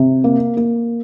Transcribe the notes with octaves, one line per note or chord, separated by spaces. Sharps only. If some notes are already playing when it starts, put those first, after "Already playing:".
Already playing: C3
A#3
A#3